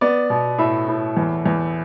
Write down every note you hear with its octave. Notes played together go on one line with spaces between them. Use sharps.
B3 D5
B2
A2 E5
A2
E2
E2